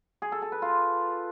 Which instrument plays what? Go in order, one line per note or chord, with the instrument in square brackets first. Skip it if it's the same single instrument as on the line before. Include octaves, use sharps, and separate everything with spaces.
[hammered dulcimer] G#4
A4
A4
B4
F4